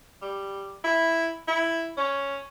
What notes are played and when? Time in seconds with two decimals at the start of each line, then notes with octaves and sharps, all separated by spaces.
0.22 G3
0.84 E4
1.48 E4
1.97 C#4